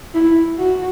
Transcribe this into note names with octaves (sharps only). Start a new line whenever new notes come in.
E4
F#4